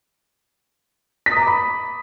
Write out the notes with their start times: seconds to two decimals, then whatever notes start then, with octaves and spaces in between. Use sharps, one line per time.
1.26 B6
1.31 D#6
1.37 A#5
1.42 D6
1.47 B5